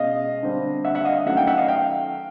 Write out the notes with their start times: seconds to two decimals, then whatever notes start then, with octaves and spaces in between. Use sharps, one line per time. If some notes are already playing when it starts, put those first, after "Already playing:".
Already playing: B2 G#3 C#4 D#5 F5
0.43 D3 G3 C4
0.85 E5 F#5
0.95 E5 F#5
1.05 D#5 F5
1.26 D#3 F#3 A3 C#4 E5 F#5
1.37 F5 G5
1.47 E5 F#5
1.58 D#5 F5
1.68 F5 G5